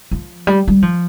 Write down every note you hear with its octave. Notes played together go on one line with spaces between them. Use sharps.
F3
G3
G3
F3